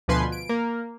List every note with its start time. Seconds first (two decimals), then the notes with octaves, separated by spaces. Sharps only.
0.08 D2 B2 F3 B4 G#5 C6
0.32 D7
0.49 A#3